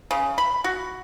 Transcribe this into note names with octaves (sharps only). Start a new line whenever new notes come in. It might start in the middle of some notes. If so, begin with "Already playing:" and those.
C#3
B5
F#4